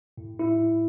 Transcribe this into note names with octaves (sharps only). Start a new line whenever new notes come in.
A2
E4